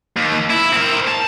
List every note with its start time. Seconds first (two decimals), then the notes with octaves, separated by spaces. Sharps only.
0.16 D#2
0.50 E4
0.73 C4 A#4
1.07 A5